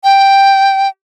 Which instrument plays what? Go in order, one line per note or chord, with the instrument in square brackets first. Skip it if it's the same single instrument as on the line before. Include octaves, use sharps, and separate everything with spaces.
[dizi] G5